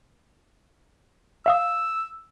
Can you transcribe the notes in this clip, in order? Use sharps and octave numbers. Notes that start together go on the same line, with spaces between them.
E5 F5 D#6 E6